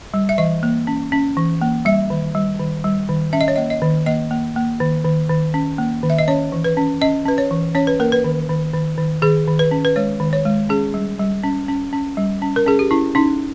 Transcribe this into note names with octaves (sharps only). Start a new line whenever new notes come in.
G3
E5
E3 D#5
A#3
C#4
C#4
E3
A#3
G3 E5
D#3
G3
D#3
G3
D#3
C#4 E5
D#5
C#5
A#3 D#5
D#5
D#3
A#3 D#5
A#3
A#3
D#3
D#3
D#3
C#4
A#3
D#3
E5
D#5
C#4 C#5
E3
B4
C#4
C#4 D#5
C#4 B4
C#5
E3
C#4 C#5
B4
A#3 A#4
B4
D#3
D#3
D#3
D#3
D#3 G#4
D#3
B4
C#4
B4
G#3 C#5
D#3
C#5
G#3
C#4 G#4
G3
G3
C#4
C#4
C#4
G3
C#4
A#4
C#4 G#4
G4
C#4 E4
C#4 D#4